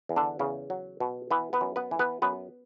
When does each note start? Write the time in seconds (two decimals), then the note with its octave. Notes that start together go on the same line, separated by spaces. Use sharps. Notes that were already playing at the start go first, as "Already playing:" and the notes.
0.09 E2
0.16 D3 D4
0.39 E2 C#3 C#4
0.70 F#3
1.00 B2
1.31 E3 B3 B4
1.53 B3 B4
1.61 F#2
1.76 B3 B4
1.91 E3
1.99 B3 B4
2.22 F#2 B3 B4